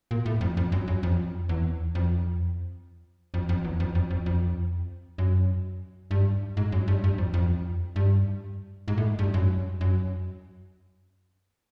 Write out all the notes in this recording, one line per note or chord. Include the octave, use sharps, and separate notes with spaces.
A#2
A2
F2
F2
F#2
F#2
F2
E2
F2
F2
F2
E2
F2
F2
F2
F2
F#2
G2
G#2
F#2
G2
G2
F2
F2
G2
G#2
A2
G#2
G2
F#2
F#2